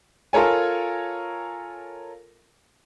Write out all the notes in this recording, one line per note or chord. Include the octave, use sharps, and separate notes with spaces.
F4 A4 A#4 C#5 G#5